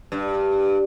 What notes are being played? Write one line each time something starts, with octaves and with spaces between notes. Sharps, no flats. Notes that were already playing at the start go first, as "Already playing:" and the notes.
G2